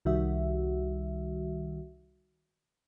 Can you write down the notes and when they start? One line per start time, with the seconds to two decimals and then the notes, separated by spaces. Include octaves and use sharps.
0.05 C2 D#3 G3 F#4 E5